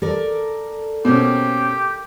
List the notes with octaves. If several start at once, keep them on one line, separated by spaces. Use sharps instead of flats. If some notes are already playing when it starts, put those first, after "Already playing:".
A4 A#4 D5
B2 A#3 C4 C#4 G4